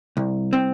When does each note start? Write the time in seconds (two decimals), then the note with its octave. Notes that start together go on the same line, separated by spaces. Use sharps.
0.17 C2
0.53 C4